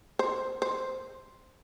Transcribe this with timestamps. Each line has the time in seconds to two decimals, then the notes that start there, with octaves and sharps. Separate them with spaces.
0.19 C5
0.62 C5